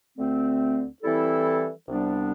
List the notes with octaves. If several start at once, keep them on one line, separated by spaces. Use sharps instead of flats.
D2 D3 A3 C4
E3 G3 C4 E4 A4
C2 C3 G3 B3 D4